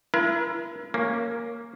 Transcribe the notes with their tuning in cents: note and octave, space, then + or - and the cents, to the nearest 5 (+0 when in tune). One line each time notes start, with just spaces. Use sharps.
E4 +40 A#4 +45
A#3 +0 C#4 +0